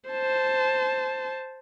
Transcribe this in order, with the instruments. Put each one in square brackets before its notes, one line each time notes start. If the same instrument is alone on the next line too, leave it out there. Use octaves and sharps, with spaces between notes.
[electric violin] C5 A5